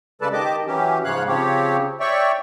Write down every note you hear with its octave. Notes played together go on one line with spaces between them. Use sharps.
C#3 G#3 A4 B4 D5 A5
D#3 G4 D#5 A5 D6
E3 F#3 C#4 G4
G#2 C#3 F3 C#5 F5 F#6
C#3 F3 C4 G4 C#5
C#5 D5 E5 G5 C#6